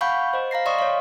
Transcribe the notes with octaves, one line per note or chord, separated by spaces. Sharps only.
F5 F#5 G#5 B5 C#6 G6
C5 D#5
F5 A#5 A#6 C7
D5 D#5 C6 C#6 D#6
C#5 F5